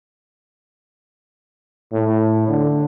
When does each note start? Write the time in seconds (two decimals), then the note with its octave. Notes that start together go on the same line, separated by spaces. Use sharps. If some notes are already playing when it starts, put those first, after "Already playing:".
1.92 A2
2.48 D3